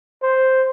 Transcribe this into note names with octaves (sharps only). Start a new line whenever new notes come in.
C5